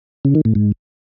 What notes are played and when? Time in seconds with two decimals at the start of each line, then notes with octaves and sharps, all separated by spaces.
0.25 C#3
0.35 D#3
0.45 A2
0.55 G#2